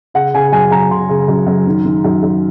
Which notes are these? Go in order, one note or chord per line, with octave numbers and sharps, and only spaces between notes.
C#3 F#5
C#3 G#5
F#2 G#5
F#2 A#5
C#3 C6
C#3
F#2
F#2
D#3
D#3
F#2
F#2